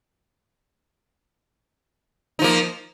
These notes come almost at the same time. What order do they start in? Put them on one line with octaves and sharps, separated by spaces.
D#4 F3 A#3